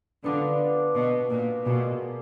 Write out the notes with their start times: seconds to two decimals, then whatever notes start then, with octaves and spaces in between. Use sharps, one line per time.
0.24 D3 B3 D4 F4
0.94 B2
1.30 A#2
1.65 B2 A#3 F4 G#4